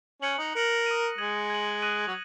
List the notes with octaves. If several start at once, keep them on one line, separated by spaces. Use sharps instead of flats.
C#4 F#6 C#7 F#7
D#4
A#4 F#6 C#7 F#7
D#6 A#6 D#7
G#3 D#6 G#6 D#7 F#7
G#6 F#7
D#6 F#6 A#6 D#7 F#7
F#3